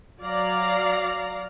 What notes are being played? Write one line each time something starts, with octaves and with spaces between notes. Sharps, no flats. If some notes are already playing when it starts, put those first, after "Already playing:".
F#3 D5 F5 A#5